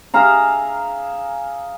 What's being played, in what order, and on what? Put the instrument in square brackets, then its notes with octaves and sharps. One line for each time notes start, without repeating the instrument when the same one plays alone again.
[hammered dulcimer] G#4 E5 F5 A#5